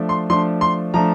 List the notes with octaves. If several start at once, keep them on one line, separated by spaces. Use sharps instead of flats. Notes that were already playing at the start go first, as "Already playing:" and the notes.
Already playing: F3 A3 D4
C6
F3 A3 D4 C6
C6
F3 A3 D4 A#5